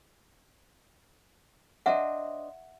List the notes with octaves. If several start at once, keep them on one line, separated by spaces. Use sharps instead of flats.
D4 C5 D#5 E5 F#5